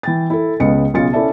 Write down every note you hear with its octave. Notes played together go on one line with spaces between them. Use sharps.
E3 G5 A6
E4 A4
C#2 C#3 B3 B4 D#5 C#7
B1 C#3 F4 A6 C#7
C#4 E4 A4 D5 E5 A5